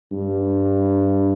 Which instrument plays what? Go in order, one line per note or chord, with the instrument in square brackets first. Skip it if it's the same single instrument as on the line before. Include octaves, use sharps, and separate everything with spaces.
[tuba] G2